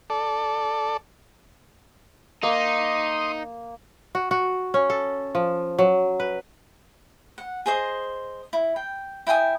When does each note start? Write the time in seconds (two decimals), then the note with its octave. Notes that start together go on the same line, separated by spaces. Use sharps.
0.10 A4 D5
2.43 A#3 D#4 C6 D#6
4.15 F#4
4.31 F#4
4.74 C#4
4.90 A4
5.35 F3
5.79 F#3
6.20 B4
7.38 F#5
7.66 G#4 C5 D#5
8.53 E4
8.76 G5
9.27 E4 G5 G#5 D#6